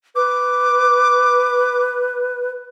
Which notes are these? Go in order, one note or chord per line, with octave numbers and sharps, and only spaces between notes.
B4 D6